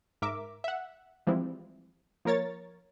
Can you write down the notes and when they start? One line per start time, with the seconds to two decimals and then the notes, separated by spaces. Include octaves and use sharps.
0.22 G#2 A#4 E5 D6
0.64 E5 F#5
1.27 E3 F3 G3 G#3 C4 E4
2.25 F3 A#3 A#4 C#5 A6